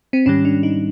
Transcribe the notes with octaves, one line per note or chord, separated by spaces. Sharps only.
C4
G#2 D#3 G3 C#4
D4
D#4